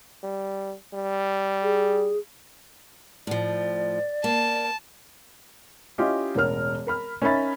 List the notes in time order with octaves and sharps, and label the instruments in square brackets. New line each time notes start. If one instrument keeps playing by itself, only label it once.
[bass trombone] G3
G3
[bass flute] G#4
[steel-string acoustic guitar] A2 F3 [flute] D5
[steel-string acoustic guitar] A#3 [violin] A5
[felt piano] C#4 E4 F4 G4 D#5 F5
E1 A1 A#4 F6
A#4 B5 F6
C#4 D#4 A#4 E5 B5 A6